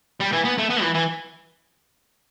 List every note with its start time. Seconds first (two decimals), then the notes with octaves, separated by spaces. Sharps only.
0.20 G3
0.32 E3
0.45 B3
0.58 A3
0.70 B3
0.82 E3
0.94 E3